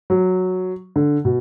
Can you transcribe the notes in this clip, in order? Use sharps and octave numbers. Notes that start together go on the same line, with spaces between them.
F#3
D3
B2